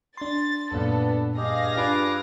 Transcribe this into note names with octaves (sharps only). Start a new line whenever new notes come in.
D4 C6 A6
F#2 A#2 B3 D4 A4
G2 G4 G#4 D#5 F5 A#6
D4 F4 B4 D6